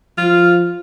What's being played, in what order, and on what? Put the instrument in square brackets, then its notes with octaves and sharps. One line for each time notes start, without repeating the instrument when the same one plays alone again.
[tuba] F3 [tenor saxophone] F4